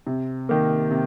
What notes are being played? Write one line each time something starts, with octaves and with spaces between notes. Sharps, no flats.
C3
D#3 A#3
C3